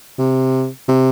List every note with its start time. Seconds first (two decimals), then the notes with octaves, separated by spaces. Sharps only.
0.18 C3
0.88 C3